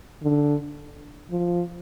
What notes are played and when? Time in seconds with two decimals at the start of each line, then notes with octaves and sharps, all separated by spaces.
0.23 D3
1.31 F3